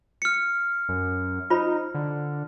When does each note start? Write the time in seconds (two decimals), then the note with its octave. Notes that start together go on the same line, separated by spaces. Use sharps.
0.22 F6 C#7
0.89 F#2
1.50 D#4 F4 C5 B5
1.94 D3